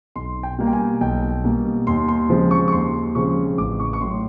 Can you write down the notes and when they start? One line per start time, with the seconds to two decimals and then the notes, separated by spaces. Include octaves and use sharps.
0.15 B1 C6
0.43 G5
0.58 B2 G3 A#3
0.67 G5
0.73 G#5
1.01 B1 G5
1.44 B2 G3 A#3
1.87 D#2 C6
2.08 C6
2.30 C#3 F3 G#3 C4
2.51 C#6
2.68 C#6
2.73 D#2 C6
3.15 C#3 F3 G#3 C4 C#6
3.58 A1 D6
3.80 C#6
3.93 C#6
4.01 A2 C6
4.04 F#3